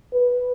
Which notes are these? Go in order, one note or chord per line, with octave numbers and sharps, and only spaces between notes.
B4